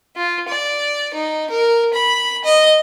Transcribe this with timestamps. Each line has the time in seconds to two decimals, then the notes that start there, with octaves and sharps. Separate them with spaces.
0.16 F4
0.49 D5
1.14 D#4
1.50 A#4
1.94 B5
2.44 D#5